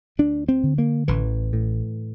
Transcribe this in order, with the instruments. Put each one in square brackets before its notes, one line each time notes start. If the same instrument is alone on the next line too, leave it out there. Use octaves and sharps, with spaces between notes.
[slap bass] D2 D4
C4
D3
A#3
A1 E3
A2